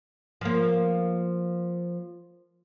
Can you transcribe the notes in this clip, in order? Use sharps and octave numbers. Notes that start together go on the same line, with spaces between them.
F3 A#3